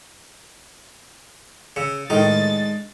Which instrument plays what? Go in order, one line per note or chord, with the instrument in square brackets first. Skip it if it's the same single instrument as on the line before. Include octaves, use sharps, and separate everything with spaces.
[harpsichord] C#3 [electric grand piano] E6 C#7
[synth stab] A2 D#3 [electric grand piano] G#3 D4 [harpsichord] D#4 [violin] A6